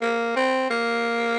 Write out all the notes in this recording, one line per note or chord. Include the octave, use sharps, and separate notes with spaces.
A#3
C4
A#3